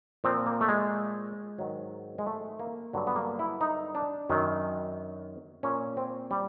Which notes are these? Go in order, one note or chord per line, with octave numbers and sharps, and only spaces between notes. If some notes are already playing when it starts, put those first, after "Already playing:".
A#2 F3 C4
A#3
A3
G#3
G#2 D#3 F#3
G#3
A3
A#3
G2 D3 F#3
B3
A#3
E4
D#4
D4
F#2 D#3 F#3
A#2 F3 C#4
C4
G3